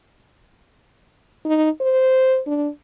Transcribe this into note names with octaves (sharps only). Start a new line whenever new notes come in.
D#4
C5
D4